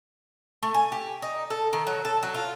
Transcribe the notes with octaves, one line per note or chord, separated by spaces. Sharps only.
A3
G#5
G4
D#4
A4
D#3
F#3
A4
F#3
F4